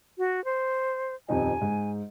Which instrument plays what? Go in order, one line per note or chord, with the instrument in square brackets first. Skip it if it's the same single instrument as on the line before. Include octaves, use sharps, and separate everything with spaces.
[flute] F#4
C5
[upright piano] D#1 F2 D#4 [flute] G#5
[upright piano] G#2